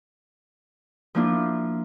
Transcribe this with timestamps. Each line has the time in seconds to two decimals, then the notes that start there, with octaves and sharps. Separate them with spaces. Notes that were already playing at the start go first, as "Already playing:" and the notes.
1.15 F3 A#3 D4 E4 F4